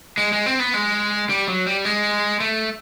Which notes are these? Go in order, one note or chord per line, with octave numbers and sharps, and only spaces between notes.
G#3
G#3
C4
B3
G#3
G3
F#3
G3
G#3
A3